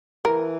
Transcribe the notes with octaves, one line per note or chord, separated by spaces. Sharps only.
E3 A#4